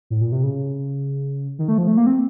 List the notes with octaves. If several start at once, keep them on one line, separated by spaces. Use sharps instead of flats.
A2
A#2
C3
C#3
D#3
A3
F3
A3
A#3
C4